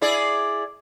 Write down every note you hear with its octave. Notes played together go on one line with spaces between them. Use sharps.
E4 G#4 D5